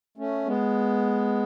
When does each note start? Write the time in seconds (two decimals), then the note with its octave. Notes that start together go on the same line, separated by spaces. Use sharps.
0.18 A3 C#4
0.46 G#3 B3